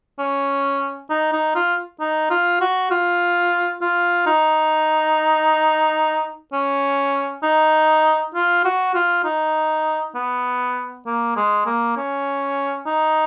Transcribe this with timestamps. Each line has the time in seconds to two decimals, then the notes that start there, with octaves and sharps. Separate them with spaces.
0.19 C#4
1.10 D#4
1.33 D#4
1.55 F4
2.00 D#4
2.30 F4
2.61 F#4
2.91 F4
3.82 F4
4.26 D#4
6.53 C#4
7.43 D#4
8.35 F4
8.65 F#4
8.95 F4
9.24 D#4
10.15 B3
11.06 A#3
11.36 G#3
11.66 A#3
11.97 C#4
12.87 D#4